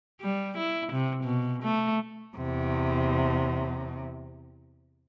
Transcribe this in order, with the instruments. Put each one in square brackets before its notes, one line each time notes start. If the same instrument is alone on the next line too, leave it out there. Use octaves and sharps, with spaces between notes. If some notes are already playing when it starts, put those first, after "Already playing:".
[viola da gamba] G3
E4
C3
B2
A3
[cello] E2 C3